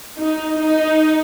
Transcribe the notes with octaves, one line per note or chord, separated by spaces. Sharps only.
D#4
D#4